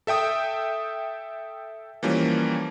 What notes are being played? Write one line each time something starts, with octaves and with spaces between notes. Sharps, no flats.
A4 E5 G5 D#6
E3 F3 G3 A#3 C#4